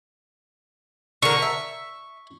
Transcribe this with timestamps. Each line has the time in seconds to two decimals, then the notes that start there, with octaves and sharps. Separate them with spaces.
1.23 D3 A#4 C#6
1.42 E5